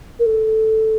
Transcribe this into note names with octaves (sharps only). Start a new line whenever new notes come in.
A#4
A4